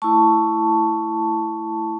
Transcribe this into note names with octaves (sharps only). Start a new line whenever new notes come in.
A3 E4 A5 C#6